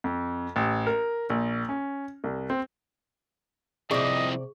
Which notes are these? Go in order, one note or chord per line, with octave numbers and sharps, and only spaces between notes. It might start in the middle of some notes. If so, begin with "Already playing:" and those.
F2
A1
A#4
A#1
C#4
C2
C4
C3 F3 C4 E4 G#4 D5 D#5 C#6